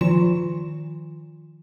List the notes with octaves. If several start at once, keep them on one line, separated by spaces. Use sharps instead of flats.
D#3 F3 F4 C6 E7